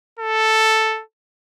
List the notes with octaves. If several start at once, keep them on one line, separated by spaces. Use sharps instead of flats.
A4